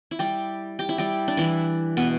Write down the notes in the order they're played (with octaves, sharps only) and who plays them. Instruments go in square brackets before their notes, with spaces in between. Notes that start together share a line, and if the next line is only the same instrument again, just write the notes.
[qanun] E4
G3 G4
G4
E4
G3 G4
D4
E3 E4
B2 B3